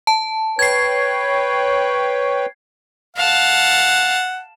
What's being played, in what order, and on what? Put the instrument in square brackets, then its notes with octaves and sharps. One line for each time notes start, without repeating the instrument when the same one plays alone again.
[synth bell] A5
[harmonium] B4 C#5 G5 [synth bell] G#6 C7
[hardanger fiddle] F5 A5 [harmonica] F#5